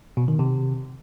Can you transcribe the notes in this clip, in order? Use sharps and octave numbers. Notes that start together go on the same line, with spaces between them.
B2
D#3
C3